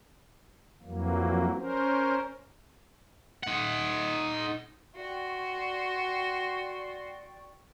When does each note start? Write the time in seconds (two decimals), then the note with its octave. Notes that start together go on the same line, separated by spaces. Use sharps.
0.82 F2 E3 F#3 A#3
1.57 C#4 A#4 C5
3.43 D#4 F#5
4.96 F#4 D5 G5 C6 C#6